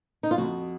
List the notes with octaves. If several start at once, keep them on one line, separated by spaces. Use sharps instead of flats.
D#4
F4
F2 F#4